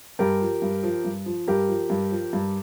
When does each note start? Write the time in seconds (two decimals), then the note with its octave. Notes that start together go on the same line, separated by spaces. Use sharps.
0.19 G2 G4 A#4
0.41 F3
0.62 G2
0.83 F3
1.05 G2
1.26 F3
1.48 G2 G4 A#4
1.69 F3
1.90 G2
2.12 F3
2.33 G2